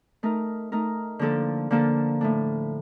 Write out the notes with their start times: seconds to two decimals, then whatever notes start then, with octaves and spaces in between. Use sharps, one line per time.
0.23 A3 D#4 A#4
0.72 A3 D#4 A#4
1.19 D3 F3 A#3 D4 A4
1.71 D3 F3 A#3 D4 A4
2.21 A2 A3 D4